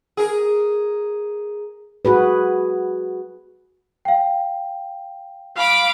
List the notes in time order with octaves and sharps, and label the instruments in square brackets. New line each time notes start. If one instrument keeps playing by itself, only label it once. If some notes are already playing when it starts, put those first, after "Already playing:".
[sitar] G#4 A#4
[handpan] F#4 G#4 B4
[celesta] F5 G5
[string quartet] F5 B5 D6